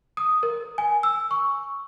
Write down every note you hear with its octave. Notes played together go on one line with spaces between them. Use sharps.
D#6
A#4
G#5
E6
C#6